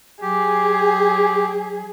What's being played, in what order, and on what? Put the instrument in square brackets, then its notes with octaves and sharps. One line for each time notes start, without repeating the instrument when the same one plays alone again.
[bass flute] F#3 [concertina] G4 [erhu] G#4